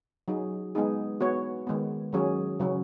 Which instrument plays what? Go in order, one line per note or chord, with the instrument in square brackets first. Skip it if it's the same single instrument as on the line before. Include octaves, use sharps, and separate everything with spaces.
[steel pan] F#3 D#4 G#4
G#3 B3 D#4 G#4
B3 F#4 C#5
D#3 G#3 B3
D#3 F#3 C#4 G#4 C#5
C#3 F#3 C#4